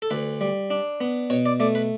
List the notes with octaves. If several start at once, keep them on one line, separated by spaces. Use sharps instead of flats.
A4
D2 B4
G3
D4
B3
B2 C#5
D5
A3 D5
B4